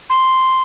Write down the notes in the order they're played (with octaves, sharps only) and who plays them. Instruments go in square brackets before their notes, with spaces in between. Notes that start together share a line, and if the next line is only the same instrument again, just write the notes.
[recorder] C6